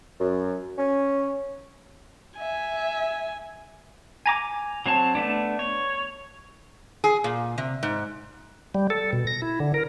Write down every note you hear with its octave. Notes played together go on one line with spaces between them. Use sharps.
F#2
C#4
E5 G#5
G#5 A#5 D6
F#3 C4 C#5 A5
A3 B3 D4
C#5
G#4
A#2
C3
G#2
G3
A4
B2
A#6
E4
D3
A#4